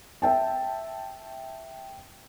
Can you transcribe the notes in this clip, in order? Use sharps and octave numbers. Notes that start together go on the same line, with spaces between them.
E5 G5 A5